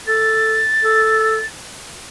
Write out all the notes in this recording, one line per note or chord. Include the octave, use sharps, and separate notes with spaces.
A4 A6
A4